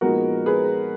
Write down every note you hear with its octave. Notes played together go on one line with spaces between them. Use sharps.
A#2 F3 G#3 B3 D#4 F#4 A#4
G#4 B4